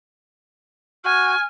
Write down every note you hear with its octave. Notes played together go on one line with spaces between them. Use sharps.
F#4 G#5 F6